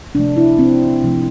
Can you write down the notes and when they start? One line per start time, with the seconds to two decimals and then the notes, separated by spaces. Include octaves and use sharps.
0.15 C3 F3 A3 D4
0.37 E4
0.59 C4
1.02 C3 F3 A3